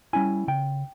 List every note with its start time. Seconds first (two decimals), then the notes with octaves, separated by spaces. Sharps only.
0.13 G3 C#4 E4 G#5
0.48 C#3 G5